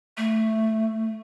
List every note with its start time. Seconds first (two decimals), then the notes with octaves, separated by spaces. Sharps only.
0.17 A3